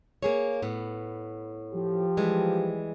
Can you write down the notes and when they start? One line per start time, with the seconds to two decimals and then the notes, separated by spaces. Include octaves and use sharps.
0.23 A#3 G#4 C#5
0.62 A2 B3
1.74 F3 G4
2.17 E3 G3 G#3